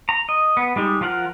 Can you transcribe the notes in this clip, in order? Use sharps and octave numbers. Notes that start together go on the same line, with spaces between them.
A#5
D#5
B3
G3 G#3 D#4 G4
F3 F4 A#4 F#5 F6